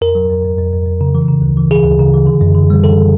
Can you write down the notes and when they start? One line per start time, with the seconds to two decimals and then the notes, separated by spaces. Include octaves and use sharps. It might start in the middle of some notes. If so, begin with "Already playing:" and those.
0.01 F2 A#4
0.15 F#3
0.30 F2
0.44 F2
0.58 F2
0.73 F2
0.86 F2
1.01 C#3
1.15 E3
1.28 C#3
1.42 D2
1.57 E3
1.71 E3 G#4
1.84 D2
1.99 C#3
2.13 E3
2.27 D3
2.41 F#2
2.55 D3
2.70 G3
2.83 F#2 A4